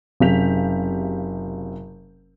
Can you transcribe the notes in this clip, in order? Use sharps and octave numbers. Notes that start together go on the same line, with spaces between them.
F#1 C3 F5 G6 B6 F7